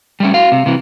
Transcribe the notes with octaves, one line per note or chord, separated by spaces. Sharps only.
G3 A3 C#4
F#4 F5
C3
C3 E3